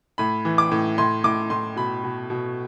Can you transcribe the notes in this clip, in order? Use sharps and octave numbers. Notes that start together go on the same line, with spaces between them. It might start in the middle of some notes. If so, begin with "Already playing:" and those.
A2 B5
E3
D6
A2
A2 C6
A2 D6
A2 C6
B2 B5
B2
B2